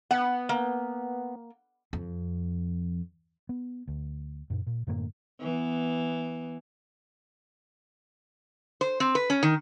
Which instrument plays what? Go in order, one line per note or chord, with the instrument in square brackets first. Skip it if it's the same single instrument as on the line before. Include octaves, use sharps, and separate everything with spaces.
[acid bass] B3 [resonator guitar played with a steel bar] F#5
[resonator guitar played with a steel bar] A#3
[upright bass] F2
[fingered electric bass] B3
D2
F#2 A#2
A#2
F#2 A2 D3 A#3
[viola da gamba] E3 B3
[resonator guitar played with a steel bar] C5
C4
B4
C#4
D#3